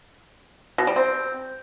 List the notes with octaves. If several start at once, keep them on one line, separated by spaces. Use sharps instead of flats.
B2
G3
C4